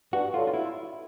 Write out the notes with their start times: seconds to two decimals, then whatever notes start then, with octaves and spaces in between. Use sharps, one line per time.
0.13 G2 F#4
0.33 D3 F#3 F4
0.47 F4
0.54 E4